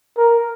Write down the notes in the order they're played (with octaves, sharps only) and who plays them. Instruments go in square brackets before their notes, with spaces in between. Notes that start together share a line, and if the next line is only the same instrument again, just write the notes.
[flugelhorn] A#4